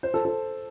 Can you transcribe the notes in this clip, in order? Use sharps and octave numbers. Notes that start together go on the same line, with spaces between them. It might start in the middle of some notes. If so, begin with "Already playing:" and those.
C5
A4
A4